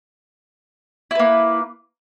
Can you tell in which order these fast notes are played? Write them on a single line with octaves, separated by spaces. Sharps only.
E4 B4 A#3